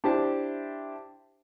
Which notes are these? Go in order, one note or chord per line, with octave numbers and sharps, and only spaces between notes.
D4 E4 G4 C5 A5